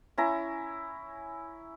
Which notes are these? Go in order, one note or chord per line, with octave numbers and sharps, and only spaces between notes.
C#4 E4 A#5